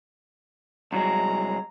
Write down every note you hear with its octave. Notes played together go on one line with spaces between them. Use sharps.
C2 F#3 G#3 A#5